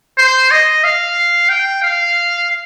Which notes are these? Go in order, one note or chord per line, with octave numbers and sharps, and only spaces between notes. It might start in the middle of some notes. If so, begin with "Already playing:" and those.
C5
D#5
F5
G5
F5